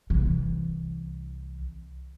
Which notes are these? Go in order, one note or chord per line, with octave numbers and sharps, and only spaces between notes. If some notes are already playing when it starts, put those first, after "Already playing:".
C2 E3